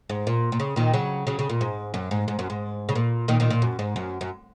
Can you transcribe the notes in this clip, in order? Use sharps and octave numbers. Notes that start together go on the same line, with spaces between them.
G#2
A#2
A#2
C#3
A#2 D#3
C#3 F#3
C#3 F#3
C#3
A#2
G#2
F#2
G#2
G#2
F#2
G#2
C#3
A#2
A#2 D#3
A#2 D#3
A#2
F#2
G#2
F#2
F#2